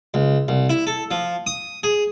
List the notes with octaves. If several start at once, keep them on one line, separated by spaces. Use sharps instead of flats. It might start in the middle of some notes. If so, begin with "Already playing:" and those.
C#2
C2
E4
A4
F3
D#6
G#4